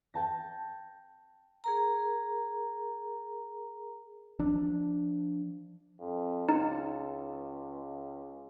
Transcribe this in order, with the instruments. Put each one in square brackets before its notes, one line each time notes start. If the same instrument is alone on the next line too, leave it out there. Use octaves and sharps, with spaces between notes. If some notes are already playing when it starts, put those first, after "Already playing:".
[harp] G5 A5 A#6
[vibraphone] G#4 A#4 A#5
[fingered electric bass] F3 D4
[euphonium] F2
[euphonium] C#2 [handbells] D#4